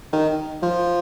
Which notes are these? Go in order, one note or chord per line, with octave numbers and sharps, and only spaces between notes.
D#3
F3